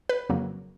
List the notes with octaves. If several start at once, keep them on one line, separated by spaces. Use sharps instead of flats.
B4
F2 C#3 F#3 A#3